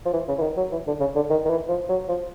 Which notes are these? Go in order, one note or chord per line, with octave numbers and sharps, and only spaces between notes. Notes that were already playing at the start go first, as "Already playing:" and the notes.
F3
E3
C#3
E3
D#3
F#3
E3
D3
C#3
D3
D#3
D#3
E3
F3
F#3
F3